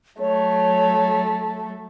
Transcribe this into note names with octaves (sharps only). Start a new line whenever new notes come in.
F#3 A3 C#5